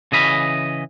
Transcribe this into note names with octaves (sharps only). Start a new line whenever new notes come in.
C#3 E3 D#5 B5